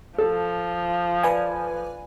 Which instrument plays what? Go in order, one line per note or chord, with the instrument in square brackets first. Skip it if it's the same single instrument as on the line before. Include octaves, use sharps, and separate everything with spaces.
[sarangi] F3 [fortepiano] A4
[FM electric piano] B4 D5 G#5